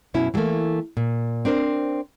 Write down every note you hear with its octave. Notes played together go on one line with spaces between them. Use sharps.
F#2 B2 C#4 E4
E3 F#3 G3 A3 A#3
A#2
C4 D4 A#4 C5